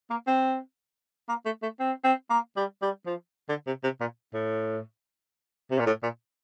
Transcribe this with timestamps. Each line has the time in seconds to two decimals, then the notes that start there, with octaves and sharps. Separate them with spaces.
0.11 A#3
0.27 C4
1.29 A#3
1.46 A3
1.63 A3
1.80 C4
2.04 C4
2.30 A#3
2.57 G3
2.82 G3
3.06 F3
3.49 D3
3.67 C3
3.84 C3
4.01 A#2
4.34 A2
5.71 C3
5.79 A#2
5.87 A2
6.03 A#2